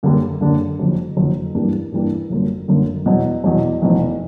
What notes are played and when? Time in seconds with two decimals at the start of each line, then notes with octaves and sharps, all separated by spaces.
0.03 F#2 D3 G3 A#3 D4
0.41 F#2 D3 G3 A#3 D4
0.79 F#1 F2 D3 F#3
1.17 F#1 F2 D3 F#3
1.55 G2 E3 G3 A#3 D4
1.92 G2 E3 G3 A#3 D4
2.30 G1 F#2 D3 F#3 A#3
2.68 G1 F#2 D3 F#3 A#3
3.06 E2 B2 F#3
3.44 E2 B2 F#3
3.82 F1 E2 B2